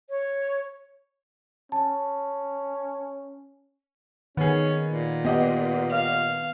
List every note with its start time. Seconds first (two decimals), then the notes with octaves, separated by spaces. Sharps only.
0.10 C#5
1.72 C#4 A5
4.37 D#3 B3 C#4 G#4
4.89 A#2
5.25 B3 G4 D#5 F#5
5.91 F5